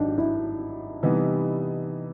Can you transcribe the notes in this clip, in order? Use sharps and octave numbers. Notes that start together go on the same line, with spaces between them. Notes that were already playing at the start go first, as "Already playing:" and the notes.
Already playing: G#1 G2 D#3 F#3 D4 D#4
E4
C3 E3 G3 B3 D#4